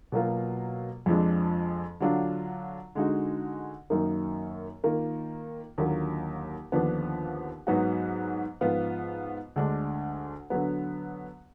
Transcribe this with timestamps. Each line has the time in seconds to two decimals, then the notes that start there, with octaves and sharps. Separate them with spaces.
0.12 B2 F#3 A#3 F4
1.06 F2 F3 G#3 D4
2.01 D3 F#3 D4 F4
2.95 D3 G#3 D#4 F#4
3.90 F#2 D#3 A#3 D#4
4.84 D#3 A#3 F4
5.78 D#2 D3 F#3 A#3 F4
6.72 D#2 D3 F3 B3 D4
7.67 G#2 F#3 B3 D#4 F#4
8.61 G#2 F3 B3 F4
9.56 D2 D3 G#3 D4
10.50 D3 F#3 B3